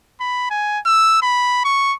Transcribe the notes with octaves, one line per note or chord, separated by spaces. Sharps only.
B5
G#5
E6
B5
C#6